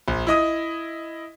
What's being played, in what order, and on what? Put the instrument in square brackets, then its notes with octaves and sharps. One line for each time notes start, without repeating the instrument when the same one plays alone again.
[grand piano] A#1
E4 D#5 D#6